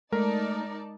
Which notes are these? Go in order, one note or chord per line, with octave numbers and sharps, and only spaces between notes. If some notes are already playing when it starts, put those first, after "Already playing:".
G#3 A3 D#4 A#4 D5 A5